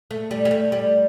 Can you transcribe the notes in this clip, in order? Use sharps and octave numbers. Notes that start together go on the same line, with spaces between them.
A3
G3
G3
A3
G3